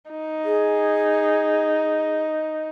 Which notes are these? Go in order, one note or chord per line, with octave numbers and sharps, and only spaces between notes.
D#4
G#4